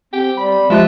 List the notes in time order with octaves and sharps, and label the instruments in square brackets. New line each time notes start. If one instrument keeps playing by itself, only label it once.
[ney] C4 [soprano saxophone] G4
[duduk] G3 [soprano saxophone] B5
[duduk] F3 [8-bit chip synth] G#3 F4 F#6 [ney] G4 [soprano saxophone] E5